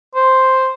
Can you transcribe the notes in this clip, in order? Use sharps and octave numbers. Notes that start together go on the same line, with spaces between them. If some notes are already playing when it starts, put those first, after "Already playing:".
C5